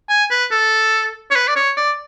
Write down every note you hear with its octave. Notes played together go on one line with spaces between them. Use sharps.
G#5
B4
A4
C#5
B4
D5
C#5
D5